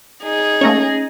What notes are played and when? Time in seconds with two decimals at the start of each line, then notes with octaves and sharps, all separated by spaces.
0.24 D#4 G#4
0.61 A3 A#3 C#4 C#5 A#6